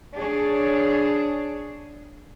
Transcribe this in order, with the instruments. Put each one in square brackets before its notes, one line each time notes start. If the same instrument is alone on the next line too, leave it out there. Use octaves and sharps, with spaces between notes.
[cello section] D4 G#4 C#5